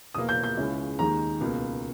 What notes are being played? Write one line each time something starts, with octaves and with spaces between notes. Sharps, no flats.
E2 B2 A#3 D#6
G6
G6
C#2 C#3 G#3 C#4 E4
D#2 D#3 G#3 A#5
C#2 B2 A#3